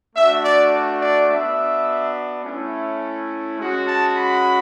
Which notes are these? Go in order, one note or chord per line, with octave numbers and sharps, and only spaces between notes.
A3 D4 F#4 E5
D5
D5
B3 D4 F#4 E5
A3 C#4 E4
G#3 C#4 F#4
A5
B5